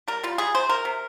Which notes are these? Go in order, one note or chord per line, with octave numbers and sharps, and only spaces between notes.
G3 A#4
G3 F4
G3 G#4
C3 C5
C3 A#4
C3